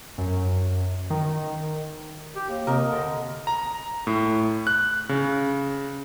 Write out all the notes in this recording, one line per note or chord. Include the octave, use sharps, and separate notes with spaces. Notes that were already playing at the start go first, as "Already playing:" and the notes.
F#2
D#3
G4
D#2
C3 A#4 D#5
D3
A#5
A2
F#6
C#3